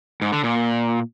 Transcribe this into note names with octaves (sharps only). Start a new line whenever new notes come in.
G#2
D3
A#2